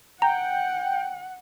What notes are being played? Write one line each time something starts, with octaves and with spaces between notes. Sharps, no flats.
F#5 G5 A#5